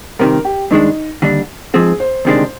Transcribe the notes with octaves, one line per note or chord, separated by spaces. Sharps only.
C2 C3 D#3 A#4
G4
G2 D#3 G#3 D4 D#4
D#2 D3 G3 D4
G#2 F3 C4 G#4
C5
D2 C3 D#3 G#3 D4